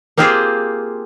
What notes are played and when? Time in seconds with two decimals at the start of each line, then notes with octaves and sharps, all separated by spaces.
0.17 A#3 C4 F4 G4 G#4 C5